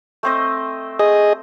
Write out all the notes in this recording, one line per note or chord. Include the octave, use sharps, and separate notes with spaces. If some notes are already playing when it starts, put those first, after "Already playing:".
A3 C4 D#5
G#4 D#5 D#6